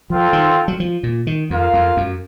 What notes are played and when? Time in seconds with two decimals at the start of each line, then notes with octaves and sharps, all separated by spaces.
0.10 F3 C4 F4 A4
0.33 D#3
0.68 F#3
0.80 F3
1.03 A#2
1.27 D#3
1.49 F2 F4 A#4 F5
1.73 F2
1.97 F#2